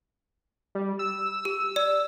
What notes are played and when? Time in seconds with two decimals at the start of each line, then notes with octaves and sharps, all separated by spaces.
0.75 G3
0.99 E6
1.45 G4
1.76 D5